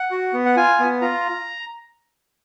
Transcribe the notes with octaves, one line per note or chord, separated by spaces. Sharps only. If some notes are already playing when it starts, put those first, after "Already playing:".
Already playing: F#5
F#4
B3
F#5
F4 G#5
B3
F4 A#5